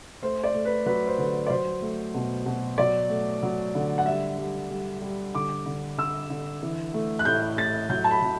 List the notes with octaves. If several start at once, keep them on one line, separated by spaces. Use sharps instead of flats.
A3 C5
D5
A3
B4
F#3 B4
C5
D3 B4
D5
F#3 C5
A3
B2
B2
F#3 D5
A3
F#3
D3
F#5
G3 E5
G3
G3
G3
D3 D6
D3
D3 E6
D3
E3
A3
F#6
A2 G6
A2 A6
F#3 G6
A5
B5
F#3